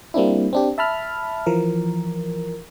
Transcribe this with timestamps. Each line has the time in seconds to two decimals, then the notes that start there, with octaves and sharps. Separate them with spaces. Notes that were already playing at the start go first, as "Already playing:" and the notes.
0.14 G3 A#3 C4 D4 E4
0.53 C4 D4 G4
0.78 E5 A5 B5 F6
1.46 E3 F3 A#4